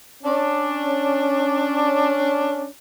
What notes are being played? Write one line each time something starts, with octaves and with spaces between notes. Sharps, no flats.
C#4 D4